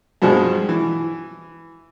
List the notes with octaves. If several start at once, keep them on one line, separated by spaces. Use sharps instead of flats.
G2 B2 F3 G#3
E3